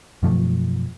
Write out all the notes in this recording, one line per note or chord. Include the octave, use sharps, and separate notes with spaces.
F#2 B2 F3 A3